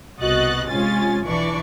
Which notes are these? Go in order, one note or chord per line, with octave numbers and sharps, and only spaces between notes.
C2 B2 F#4 D#5 F#6 A6
C3 G#3 C#4 F4 G#5 A6
B1 E3 D4 D5 C#6